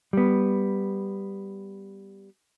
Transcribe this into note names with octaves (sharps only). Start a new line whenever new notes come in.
G3 B3